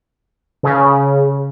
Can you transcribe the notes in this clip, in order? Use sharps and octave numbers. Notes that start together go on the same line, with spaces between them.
C#3